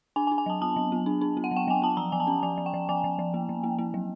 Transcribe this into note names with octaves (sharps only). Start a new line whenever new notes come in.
D4 G#5
G#5
D4
G#5
F#3 A5
B3 A5
F#3
B3
D4
D4
B3
F#5
F#3
G5
F#3 G#5
B3 A5
F3 A#5
F3 G#5
A5
C#4
F3 G#5
F3
G5
F3
F3 G#5
F3
F3
A#3
F3
A#3
A#3
F#3